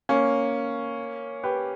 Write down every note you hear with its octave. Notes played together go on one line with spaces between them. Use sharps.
A#3 C#4
G4 B4